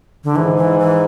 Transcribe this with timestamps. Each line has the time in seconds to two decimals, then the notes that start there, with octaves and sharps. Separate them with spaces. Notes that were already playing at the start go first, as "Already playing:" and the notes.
0.24 D3
0.35 G#2 E3
0.57 E3
0.79 E3